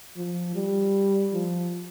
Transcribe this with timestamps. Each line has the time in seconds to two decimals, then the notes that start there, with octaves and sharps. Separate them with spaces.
0.16 F3
0.55 G3
1.33 F3